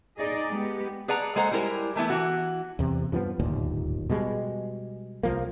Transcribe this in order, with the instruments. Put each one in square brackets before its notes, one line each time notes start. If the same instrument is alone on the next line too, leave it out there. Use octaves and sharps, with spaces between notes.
[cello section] D#4 G#4 D5 D#5
G#3 B3 G4
[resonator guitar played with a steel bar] G#4 B4 D5 F#5 A5 A#5
G#3 A#3 A4 C5 F#5 A#5
G3 G#3 E4 A#4 C5
E3 A3 B3 E4
E3 F#4
[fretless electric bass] E2 C3
G2 F3 F#3 B3
D1 G1 D#2 A#2
B2 G3 G#3
C2 F3 A#3